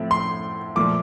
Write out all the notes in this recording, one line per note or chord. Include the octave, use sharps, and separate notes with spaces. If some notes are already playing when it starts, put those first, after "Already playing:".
Already playing: A2 F3 A3 C4
C6
A#2 F3 A3 D6